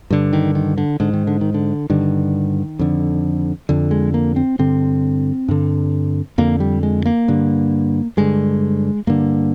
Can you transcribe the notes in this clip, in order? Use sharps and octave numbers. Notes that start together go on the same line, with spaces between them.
G2 D3
D#3
D#3
D3
G#2 D3
D#3
D3
D#3
D3
G2 D3 D#3
F2 D3
F2 D3
G#3
A#3
C4
G2 D3 C4
G2 D3
F2 D3 A#3
G3
G#3
A#3
G2 D3
G2 D3 G#3
G2 D3 A#3